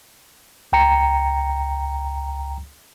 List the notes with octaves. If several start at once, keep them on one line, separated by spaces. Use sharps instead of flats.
C#2 G5 A#5 C#7